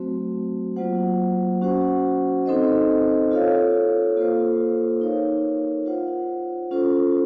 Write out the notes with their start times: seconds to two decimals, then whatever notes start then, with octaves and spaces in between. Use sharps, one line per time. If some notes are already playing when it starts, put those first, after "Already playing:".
Already playing: F#3 A3 C4 F#4 C5
0.76 F#3 A#3 F4 C5 F#5
1.61 C#4 F#4 C5 F#5
2.46 C4 D#4 A4 C5 D#5
3.31 F4 A4 C#5 F5
4.17 A#3 F4 A4 C5
5.01 D#4 A#4 C#5 F5
5.86 F4 C5 F#5
6.71 C#4 F4 A4 C5